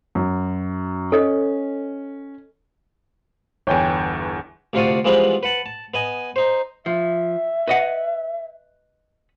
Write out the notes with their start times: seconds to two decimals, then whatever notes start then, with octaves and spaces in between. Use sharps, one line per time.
0.15 F#2
1.12 C#4 A4 D#5
3.67 G1 E2 C#5 G5 G#5
4.73 D2 C3 D4 F4 F#4 D#6
5.05 E3 F3 G3 G#3 B3 C4
5.43 B4 F#5 A5
5.66 A5
5.94 B3 D#5 G#5
6.36 D#4 C5
6.86 F3 E5
7.68 B4 D#5 F#5